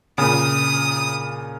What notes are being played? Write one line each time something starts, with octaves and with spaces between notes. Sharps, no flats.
A#2 C#3 D#6